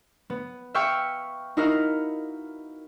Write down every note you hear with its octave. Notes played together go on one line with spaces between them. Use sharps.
B3
E5 F5 G5 C#6 E6
D#4 E4 F#4 A#4 F5